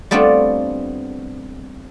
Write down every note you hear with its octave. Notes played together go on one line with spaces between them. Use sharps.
G3 A3 B3 C4 D4 F4